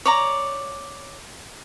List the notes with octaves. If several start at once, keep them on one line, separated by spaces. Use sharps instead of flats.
C#5 D5 A#5